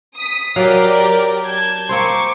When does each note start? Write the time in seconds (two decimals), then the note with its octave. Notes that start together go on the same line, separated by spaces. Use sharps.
0.15 D#6 B6
0.56 F#3 G4 A#4 D5 F5
1.45 A5 G6 G#6
1.89 A#3 C4 C5 C#6 D6